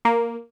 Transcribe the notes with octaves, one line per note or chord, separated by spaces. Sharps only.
A#3